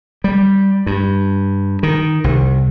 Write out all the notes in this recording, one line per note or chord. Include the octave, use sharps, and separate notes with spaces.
G3
G2
D#3
C2